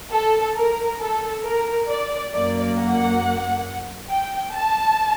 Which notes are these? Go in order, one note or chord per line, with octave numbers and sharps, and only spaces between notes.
A4
A#4
A4
A#4
D5
F#2 F#3 A#3 D5
F#5
G5
A5